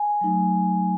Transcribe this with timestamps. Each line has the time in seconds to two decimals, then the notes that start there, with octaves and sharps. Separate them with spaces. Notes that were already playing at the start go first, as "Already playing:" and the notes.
Already playing: G#5
0.21 F#3 A3 D#4